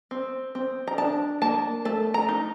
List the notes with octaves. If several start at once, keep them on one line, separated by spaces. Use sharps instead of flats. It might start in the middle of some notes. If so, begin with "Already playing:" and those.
C4
C4
A#5
D4 A5
A#3 A5
A3 A5
A#5
D#4